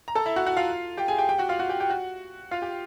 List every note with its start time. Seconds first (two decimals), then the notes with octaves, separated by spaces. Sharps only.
0.08 A#5
0.15 A4 A5
0.26 E4 E5
0.36 F#4 F#5
0.46 F#4 F#5
0.57 F4 F5
0.97 G4 G5
1.08 G#4 G#5
1.18 G4 G5
1.29 G4 G5
1.38 F#4 F#5
1.49 F4 F5
1.59 F#4 F#5
1.69 G4 G5
1.80 G4 G5
1.90 F#4 F#5
2.51 F4 F5
2.62 G4 G5